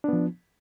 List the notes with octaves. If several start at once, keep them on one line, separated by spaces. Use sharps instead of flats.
F3 B3 D4